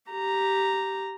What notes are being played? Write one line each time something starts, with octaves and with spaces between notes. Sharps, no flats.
G4 A#5